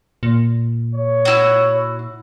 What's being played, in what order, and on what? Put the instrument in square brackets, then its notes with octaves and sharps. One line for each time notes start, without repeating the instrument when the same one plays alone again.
[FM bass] A#2
[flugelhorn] C#5
[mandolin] E4 F#4